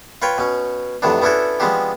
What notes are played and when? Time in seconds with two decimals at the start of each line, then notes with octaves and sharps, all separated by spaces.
0.22 F4 B4 C#5 G5
0.38 B2 C#4
1.02 F2 A2 C3 B3 D4
1.22 B3 C#4 D4 E4 F#4 A4
1.60 F3 G#3 B3 C4 D4 G4